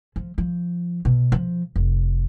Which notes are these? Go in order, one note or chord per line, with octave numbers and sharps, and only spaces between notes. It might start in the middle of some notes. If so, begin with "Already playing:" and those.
F3
F3
B2
F3
F1